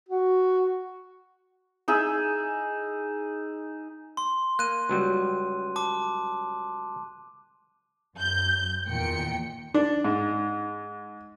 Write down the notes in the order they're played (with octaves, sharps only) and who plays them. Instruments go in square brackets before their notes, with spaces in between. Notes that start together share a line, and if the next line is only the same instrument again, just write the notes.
[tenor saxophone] F#4
[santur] D#4 G#4 E5
[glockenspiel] C6
[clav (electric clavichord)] A#3 [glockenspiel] F#6 D#7
[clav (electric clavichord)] C#2 F#3 G3
[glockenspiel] A5 D6
[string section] F#2 G6
E2 A#2 D#3 G5 C#7
[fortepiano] D4
G#2